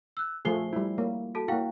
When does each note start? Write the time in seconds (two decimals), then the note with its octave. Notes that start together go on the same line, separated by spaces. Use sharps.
0.17 E6 F#6
0.45 F3 A3 G#4 C5 C7 G7
0.73 G3 E4
0.98 A#3
1.35 F#4 A4 A5
1.48 A#3 E4 F#4 F5 G5